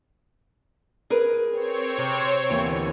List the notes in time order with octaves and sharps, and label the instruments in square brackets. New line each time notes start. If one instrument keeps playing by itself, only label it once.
[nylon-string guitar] G#4 A#4 B4
[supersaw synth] C4 C#5
[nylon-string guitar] C3
[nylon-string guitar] D#2 E3 B3 [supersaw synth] D3